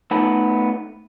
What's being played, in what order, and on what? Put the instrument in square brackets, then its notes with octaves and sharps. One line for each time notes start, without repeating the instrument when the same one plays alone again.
[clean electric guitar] A3 B3 D#4 A4 B5